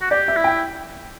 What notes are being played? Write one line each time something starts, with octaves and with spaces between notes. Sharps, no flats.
F#4
G4 D5
E5
E4
G5